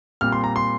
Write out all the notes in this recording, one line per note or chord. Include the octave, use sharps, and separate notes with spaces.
A#2 G3 C4 F6
C6
A#5
C6